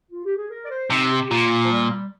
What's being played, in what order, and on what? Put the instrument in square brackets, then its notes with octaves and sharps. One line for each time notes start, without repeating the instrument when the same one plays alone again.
[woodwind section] F4
G4
G#4
A#4
D5
C5
[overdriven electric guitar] C3 [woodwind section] D#4
[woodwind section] G4
[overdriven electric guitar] A#2 [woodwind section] F4
[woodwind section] F3
G3